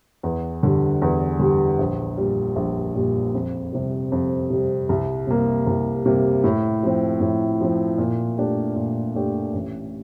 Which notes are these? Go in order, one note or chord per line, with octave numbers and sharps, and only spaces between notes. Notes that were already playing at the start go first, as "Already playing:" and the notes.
E2
D3 G3
E2
D3 G3
A#1
A#2 G3
A#1
A#2 G3
F2
C3 G3
F2
C3 G3
C2
C3 G3 A#3
C2
C3 G3 A#3
A2
F3 C4
A2
F3 C4
A#2
A3 D4 G4
A#2
A3 D4 G4
A1